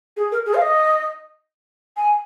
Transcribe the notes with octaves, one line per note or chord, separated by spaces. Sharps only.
G#4
A#4
G#4
F5
D#5
G#5